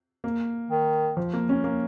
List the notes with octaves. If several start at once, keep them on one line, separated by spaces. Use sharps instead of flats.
A#3
D#3
F3
A#3
C#4
A#3